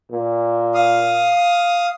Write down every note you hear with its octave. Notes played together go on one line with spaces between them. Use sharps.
A#2
F5 D#6